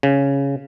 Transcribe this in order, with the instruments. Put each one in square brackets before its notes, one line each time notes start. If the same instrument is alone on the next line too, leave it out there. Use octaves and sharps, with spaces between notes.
[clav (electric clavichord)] C#3